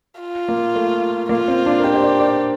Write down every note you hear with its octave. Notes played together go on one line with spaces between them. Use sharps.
F4
A#3
A3
A#3 F4
C4
D4
A#4
G4 C5
C5
D5
D5